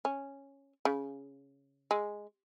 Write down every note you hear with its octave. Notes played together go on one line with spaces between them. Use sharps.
C#4
C#3
G#3